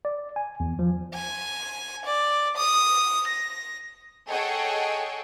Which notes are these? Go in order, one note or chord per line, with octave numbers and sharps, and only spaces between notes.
D5
G#5
E2
F3
G#5
D5
D#6
A#6
G#4 A4 C#5 D#5 F#5 G5